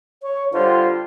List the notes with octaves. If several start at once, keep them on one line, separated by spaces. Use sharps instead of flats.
C#5
D3 G3 F4 C5